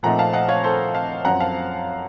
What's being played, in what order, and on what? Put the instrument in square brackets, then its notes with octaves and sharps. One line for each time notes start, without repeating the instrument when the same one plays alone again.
[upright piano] A#2 F3 A3 C4 D#4 F#5 A#5
F5 A5
D#5 F#5
C#5 F5
A4 C5
F5 A5
F#2 F3 C4 F#5 A#5
F5 A5